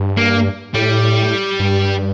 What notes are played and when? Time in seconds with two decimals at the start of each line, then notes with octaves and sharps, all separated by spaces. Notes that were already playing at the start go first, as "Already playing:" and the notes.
Already playing: G2
0.17 A#3
0.74 A2 G3
1.60 G2